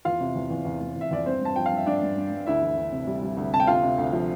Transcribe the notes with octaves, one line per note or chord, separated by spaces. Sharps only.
E2 F4 F5
C3
E2
E2
E2
E2
E2 E5
E2 D5
G2 C4 C5
G2 A5
F3 G5
F5
G2 E5
G2 D4 D5
G2
G2
G2
D2 E4 E5
E3
D2
C3
G3
G3
D2
C3 A5
G5
D2 F4 F5
C3
D2
F3